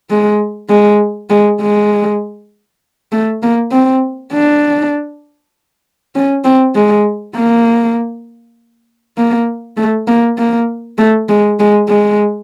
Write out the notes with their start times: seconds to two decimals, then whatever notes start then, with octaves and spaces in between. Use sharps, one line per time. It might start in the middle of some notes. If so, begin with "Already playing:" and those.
0.10 G#3
0.70 G#3
1.30 G#3
1.61 G#3
3.12 A3
3.43 A#3
3.72 C4
4.32 D4
6.15 C#4
6.44 C4
6.75 G#3
7.36 A#3
9.18 A#3
9.77 A3
10.07 A#3
10.38 A#3
10.98 A3
11.29 G#3
11.60 G#3
11.89 G#3